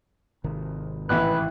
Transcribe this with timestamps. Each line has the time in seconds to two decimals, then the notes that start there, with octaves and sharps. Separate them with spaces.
0.44 G#1 C3 D#3
1.09 A1 E3 B4 E5 G5 F#6